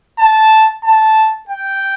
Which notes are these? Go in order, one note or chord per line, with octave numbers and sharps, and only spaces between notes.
A5
A5
G5